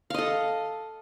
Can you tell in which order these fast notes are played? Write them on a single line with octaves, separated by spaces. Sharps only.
F5 D#5 A4